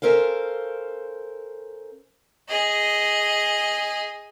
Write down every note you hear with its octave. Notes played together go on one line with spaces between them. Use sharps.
C#4 A4 A#4 C5 F5
G#4 D#5